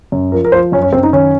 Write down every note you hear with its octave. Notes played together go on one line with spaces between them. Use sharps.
F#2
F3 A#4
A#4
F3 C5
F#2 C#4
C#4
F#2 C4
D#4
D#3 C#4